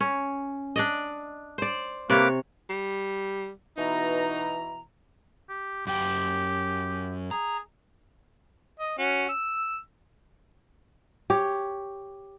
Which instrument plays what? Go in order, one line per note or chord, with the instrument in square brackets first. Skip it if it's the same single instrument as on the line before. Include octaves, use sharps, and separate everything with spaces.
[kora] C#4
D4 D5 D#5
C5 D5
[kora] C3 C#5 [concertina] A#3 B4 D6
[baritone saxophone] G3
[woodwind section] B2 E3 A#5 [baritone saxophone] D#4
[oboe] G4
[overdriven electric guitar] F#2 G5 [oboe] G4
[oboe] G#4 [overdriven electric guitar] A#5
[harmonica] D#5
C#4 F#4
E6
[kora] G4 C#5